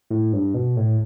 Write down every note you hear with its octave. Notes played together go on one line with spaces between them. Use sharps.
A2
G2
B2
A2